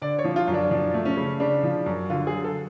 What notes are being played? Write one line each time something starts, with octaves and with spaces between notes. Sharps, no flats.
D3 D5
C#5
F3
F4
F#2
D4
F3 D4
A3
C#4
C#3
C#3 D4
F3
F#2
D3 F4
G#4
F#3
A4